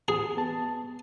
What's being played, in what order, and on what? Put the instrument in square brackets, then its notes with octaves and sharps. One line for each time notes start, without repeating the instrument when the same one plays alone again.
[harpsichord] G#4
[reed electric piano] B3 A5